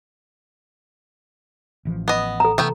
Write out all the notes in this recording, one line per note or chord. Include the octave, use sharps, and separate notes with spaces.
A1 E3 F3
B3 D#5
A4 A#5
C3 E3 A3 B3 G5